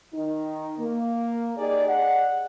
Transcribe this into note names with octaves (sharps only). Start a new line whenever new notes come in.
D#3 D#4
A#3
D#4 G4 G#4 D5
G#4 D5 D#5 F#5